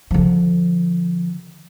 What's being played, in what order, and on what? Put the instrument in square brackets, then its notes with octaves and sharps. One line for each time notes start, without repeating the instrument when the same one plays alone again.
[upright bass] D3 F3